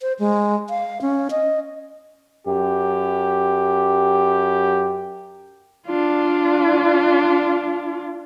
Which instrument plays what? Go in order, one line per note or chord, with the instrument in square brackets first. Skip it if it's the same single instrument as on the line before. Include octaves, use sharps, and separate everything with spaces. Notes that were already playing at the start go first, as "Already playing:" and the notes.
[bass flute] C5
G#3
F5
C#4
D#5
[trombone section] F#2 G4
[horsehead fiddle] D4 F4